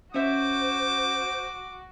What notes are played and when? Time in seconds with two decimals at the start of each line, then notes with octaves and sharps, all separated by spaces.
0.14 C#4 F#4 C5 E5 D6